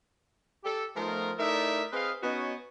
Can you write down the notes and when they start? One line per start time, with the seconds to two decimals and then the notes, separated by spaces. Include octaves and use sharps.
0.64 G4 A4
0.96 F3 A3 B3 D#4 F4 A#4
1.38 A3 D#4 E4 A#4 D5 E5
1.93 C4 G#4 B4 D#5 F5
2.23 B3 C#4 D#4 F#4 C#5 D#5